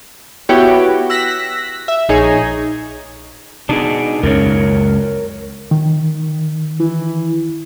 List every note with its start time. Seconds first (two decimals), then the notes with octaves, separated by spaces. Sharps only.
0.49 B3 E4 F#4 G4 C#5 G5
1.10 E6 F#6 A#6 B6
1.88 E5
2.09 A#1 D#4 G#4 C#5 G#6
3.69 B2 D4 D#4 G#4
4.23 C#2 F#2 C#3 A#4 C#5
5.71 D#3
6.80 E3